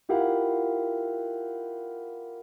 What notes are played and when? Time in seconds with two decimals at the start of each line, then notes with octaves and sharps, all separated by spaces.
0.09 E4 F4 G4 A#4 F5 F#5